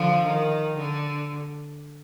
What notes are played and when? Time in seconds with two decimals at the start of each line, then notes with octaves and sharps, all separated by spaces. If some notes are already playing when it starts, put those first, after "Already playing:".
Already playing: D3 F3
0.23 D#3
0.78 D3